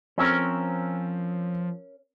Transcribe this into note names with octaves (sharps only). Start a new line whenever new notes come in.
F3 C4 C#4 A#4 E6